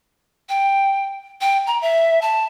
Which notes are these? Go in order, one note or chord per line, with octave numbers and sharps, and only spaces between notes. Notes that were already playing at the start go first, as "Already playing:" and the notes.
G5
G5
A#5
E5
A5